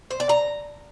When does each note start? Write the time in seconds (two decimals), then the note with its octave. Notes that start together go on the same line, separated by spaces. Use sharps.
0.11 C5
0.20 D5
0.29 A#5